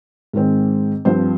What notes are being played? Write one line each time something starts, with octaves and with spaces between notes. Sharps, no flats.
G#2 D#3 G#3 C4
G2 F3 C4 C5